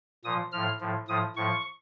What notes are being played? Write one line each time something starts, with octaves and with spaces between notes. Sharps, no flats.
A#2 F3 D#6
A2 F3 F6
A2 F3
A2 F3 D#6
A2 F3 C#6